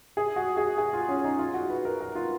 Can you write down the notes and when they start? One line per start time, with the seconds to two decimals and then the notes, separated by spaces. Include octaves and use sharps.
0.17 G#4
0.36 F#4
0.57 G#4
0.78 G#4
0.93 F4
1.08 C#4
1.24 D#4
1.39 F4
1.54 F#4
1.70 B4
1.85 A#4
2.01 A#4
2.15 F4